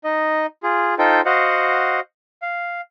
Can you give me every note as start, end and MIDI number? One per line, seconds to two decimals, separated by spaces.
0.04 0.46 63
0.04 0.46 75
0.63 0.95 65
0.63 0.95 68
0.99 1.21 63
0.99 1.21 65
0.99 1.21 69
0.99 1.21 72
0.99 1.21 79
1.26 2.00 66
1.26 2.00 72
1.26 2.00 75
1.26 2.00 77
1.26 2.00 78
2.42 2.81 77